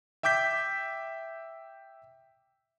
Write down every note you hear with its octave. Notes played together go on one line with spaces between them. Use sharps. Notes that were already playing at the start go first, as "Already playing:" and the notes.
E5 G5 D6 G6 B6